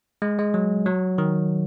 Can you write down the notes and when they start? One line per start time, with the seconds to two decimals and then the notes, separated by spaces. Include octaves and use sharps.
0.22 G#3
0.39 G#3
0.54 F#3
0.86 F#3
1.18 D#3